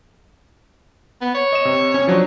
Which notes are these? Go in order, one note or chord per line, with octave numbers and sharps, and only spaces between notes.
B3
C#5
D#5 E7
C3
C#4
F3 F#3 D4